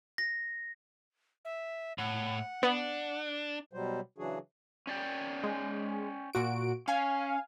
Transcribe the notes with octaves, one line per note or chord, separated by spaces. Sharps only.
A#6
E5
A2 F#5
B3 D4
B2 F#3 G3 C5
C#3 E3 F#3 D4 F#4 G#4
C#4 D5 G5
G#3
A#2 F#4 D7
C#4 F5 G#5